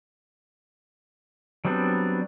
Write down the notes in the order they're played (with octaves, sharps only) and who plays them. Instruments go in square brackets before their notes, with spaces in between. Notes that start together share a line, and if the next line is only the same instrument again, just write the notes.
[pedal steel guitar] F#3 G3 B3 C4 D4